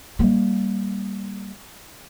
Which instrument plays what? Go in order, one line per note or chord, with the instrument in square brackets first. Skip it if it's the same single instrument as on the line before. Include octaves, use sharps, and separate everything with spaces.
[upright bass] G3 A#3